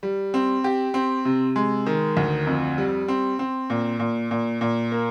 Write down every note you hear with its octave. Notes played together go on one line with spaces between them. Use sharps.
G3
C4
G4
C4
C3
G#3
D#3
D2
F2
G3
C4
C4
A#2
A#2
A#2
A#2
A#3